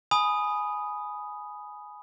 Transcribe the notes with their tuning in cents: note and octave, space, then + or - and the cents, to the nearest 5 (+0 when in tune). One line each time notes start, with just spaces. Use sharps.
G#5 +10 B5 +0 D#6 +0